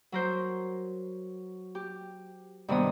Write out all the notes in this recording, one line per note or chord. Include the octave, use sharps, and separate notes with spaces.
F#3 A#4 C5
G4
G2 C3 D#3 B3 D#6